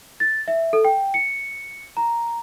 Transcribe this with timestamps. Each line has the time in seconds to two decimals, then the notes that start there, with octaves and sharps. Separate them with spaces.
0.20 A6
0.48 E5
0.73 A4
0.85 G5
1.14 C#7
1.97 A#5